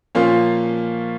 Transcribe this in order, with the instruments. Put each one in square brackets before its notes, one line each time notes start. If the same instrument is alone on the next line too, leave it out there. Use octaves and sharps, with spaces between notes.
[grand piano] A#2 F3 A#3 C#4 F4